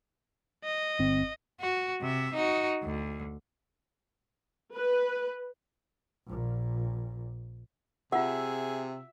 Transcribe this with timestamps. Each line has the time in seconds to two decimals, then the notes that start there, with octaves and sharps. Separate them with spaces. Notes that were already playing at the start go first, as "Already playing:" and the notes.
0.64 D#5
0.99 G1 C4
1.61 F#4
2.01 C3 E5
2.34 D#4 F#4
2.83 D2
4.75 B4
6.26 A#1 A#2
8.12 C3 F4 G#4 E5 F#5